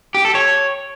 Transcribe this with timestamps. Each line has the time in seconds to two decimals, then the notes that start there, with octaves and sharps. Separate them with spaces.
0.15 G4
0.25 A4
0.35 C#5